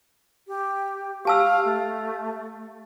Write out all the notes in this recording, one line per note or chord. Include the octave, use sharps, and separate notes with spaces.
G4
G4 F5 A5 E6
A3